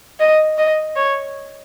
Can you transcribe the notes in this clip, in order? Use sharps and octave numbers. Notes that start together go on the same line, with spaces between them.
D#5
D#5
C#5